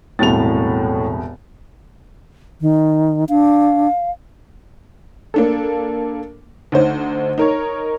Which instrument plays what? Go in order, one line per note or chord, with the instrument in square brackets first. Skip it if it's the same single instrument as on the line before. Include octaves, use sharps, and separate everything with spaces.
[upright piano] E1 C2 A6 [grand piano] A2 F7
[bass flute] D#3
[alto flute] D4 [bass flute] F5
[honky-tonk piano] A#3 D4 A4
D2 D#4 C5
D#4 A#4 C#5